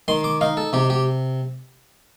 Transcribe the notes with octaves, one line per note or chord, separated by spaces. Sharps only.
D#3 C6
D6
D#4 F5
A4
C3 G4
G4